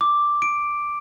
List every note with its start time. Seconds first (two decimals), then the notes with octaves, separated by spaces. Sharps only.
0.01 D6
0.42 D7